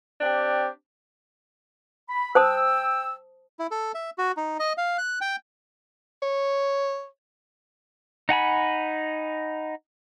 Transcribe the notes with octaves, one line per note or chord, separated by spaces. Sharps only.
C4 D4 G4
B5
C5 G5 A5 D#6 E6
E4
A4
E5
F#4
D#4
D#5
F5
F#6
G5
C#5
D#4 F#5 G#5 B5